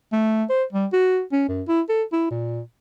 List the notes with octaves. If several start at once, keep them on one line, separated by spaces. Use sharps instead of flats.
A3
C5
G3
F#4
C#4
F#2
E4
A4
E4
A#2